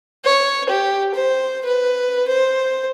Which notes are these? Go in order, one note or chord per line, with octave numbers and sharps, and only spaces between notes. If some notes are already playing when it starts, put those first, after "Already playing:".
C#5
G4
C5
B4
C5